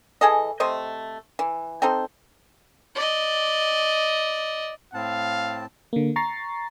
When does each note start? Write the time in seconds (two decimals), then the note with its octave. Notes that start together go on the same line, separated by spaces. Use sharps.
0.21 E3 G#4 A4 D#5
0.60 C3 A3 C5 D#5
1.39 E3
1.82 C4 D#4 A4 C5
2.95 D5 D#5
4.94 A2 C4 F5 A5
5.93 D3 A#3
6.16 A#5 C#6 A6 C7